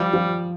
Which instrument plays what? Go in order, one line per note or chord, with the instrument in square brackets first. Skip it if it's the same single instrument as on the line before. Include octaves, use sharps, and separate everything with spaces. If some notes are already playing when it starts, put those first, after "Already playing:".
Already playing: [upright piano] F3 [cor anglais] G3
[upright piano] F3